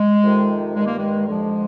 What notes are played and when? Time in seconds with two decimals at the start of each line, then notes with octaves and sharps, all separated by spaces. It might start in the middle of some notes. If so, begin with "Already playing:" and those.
Already playing: G#3
0.23 F2 C3 D#3
0.75 G2 D#3 G#3
0.86 A#3
0.98 G#3
1.27 F2 D3 F3 G#3